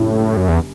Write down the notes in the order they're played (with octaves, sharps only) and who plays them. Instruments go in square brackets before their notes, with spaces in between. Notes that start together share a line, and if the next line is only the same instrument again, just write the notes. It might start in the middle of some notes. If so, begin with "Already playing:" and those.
Already playing: [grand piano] F#1 F#2 D3 G3 [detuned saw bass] A2
[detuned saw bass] F#2
E2